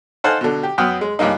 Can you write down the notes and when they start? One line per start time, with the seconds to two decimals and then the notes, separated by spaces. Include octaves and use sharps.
0.24 D#4 A4 C5 F5 F#5 G#5
0.41 B2 D3
0.63 G4
0.78 F#2 B3 G5 D#6 F6
1.01 G#3
1.19 C#2 G2 A#3 D#4